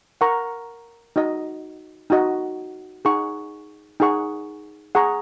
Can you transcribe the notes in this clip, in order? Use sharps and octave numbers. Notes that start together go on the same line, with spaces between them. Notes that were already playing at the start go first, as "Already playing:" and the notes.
A#4 F#5 A#5 C#6
D#4 F#4 D#5
D#4 F#4 D#5
D#4 G#4 F#5 C#6
D#4 G#4 F#5 C#6
G#4 F#5 A#5 C#6